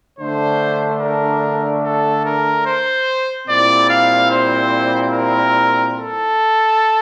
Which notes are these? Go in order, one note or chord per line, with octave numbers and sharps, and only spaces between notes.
D3 A3 D4 C5
A#4
A4
A#4
C5
A#2 G3 C4 E4 D5
F5
C5
A#4
A4